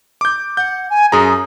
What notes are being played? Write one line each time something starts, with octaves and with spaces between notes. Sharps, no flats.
D6 G6
F#5 G6
G#5
F#2 G#4 A#5 D#6